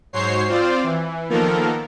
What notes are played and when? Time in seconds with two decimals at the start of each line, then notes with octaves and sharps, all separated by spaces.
0.13 G#2 F#3 C5 C#5 C7
0.48 C4 F4 C5 D5
0.83 E3
1.29 D#3 F3 A#3 B3 A4 A#4